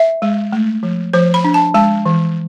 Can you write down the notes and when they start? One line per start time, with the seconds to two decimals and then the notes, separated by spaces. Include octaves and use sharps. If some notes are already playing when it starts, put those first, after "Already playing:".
Already playing: E5
0.22 G#3
0.52 A3
0.83 F3
1.13 F3 C5
1.34 B5
1.44 D4
1.54 A5
1.74 G#3 A5
2.06 E3